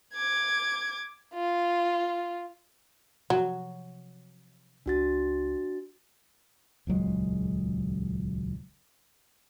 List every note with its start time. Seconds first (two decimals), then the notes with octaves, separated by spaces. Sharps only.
0.14 D6 G#6
1.34 F4
3.30 C3 F3 F#3
4.86 C#2 D4 F#4 A6
6.87 D#1 C#2 F#3 G#3